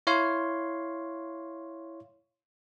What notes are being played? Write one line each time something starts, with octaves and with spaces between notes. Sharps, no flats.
E4 C#5 F5 C6